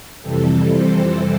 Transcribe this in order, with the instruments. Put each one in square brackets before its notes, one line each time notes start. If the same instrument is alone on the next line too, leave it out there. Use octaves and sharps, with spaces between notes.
[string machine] F2 C3 E3 G3 C4 A4
C5